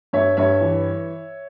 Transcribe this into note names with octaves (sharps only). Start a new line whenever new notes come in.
G2 C#5 E5
G2 C#5 E5
E3